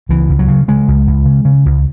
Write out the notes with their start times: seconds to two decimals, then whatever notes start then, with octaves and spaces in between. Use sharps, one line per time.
0.09 C#2 E3
0.30 C#2
0.39 F#3
0.48 C#3
0.68 C#3 G#3
0.88 C#2
1.07 C#2
1.26 C#3
1.45 C#3
1.66 C#2